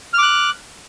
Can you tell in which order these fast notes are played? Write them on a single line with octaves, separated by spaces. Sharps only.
F6 D6 F#6